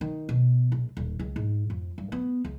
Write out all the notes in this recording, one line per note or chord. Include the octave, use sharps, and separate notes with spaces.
D#3
B2
A#1
D#1
C#2
G#2
F2
G2
B3
C#2